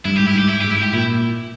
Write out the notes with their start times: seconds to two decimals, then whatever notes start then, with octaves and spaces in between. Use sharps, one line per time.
0.05 G2 E4
0.16 G#2 G4
0.27 E4
0.33 G2 G4
0.49 E4
0.60 G#2 G4
0.71 E4
0.83 G4
0.93 A#2 E4